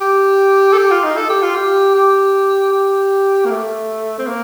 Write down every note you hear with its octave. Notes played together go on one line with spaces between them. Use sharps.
G4
A4
G4
F4
D#4
A4
G4
F4
G4
G4
G4
A#3
A3
C4
A#3